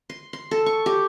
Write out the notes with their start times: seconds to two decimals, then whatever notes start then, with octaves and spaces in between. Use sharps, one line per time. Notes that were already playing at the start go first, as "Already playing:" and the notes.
0.10 C6
0.33 C6
0.51 A4
0.66 C#6
0.86 G4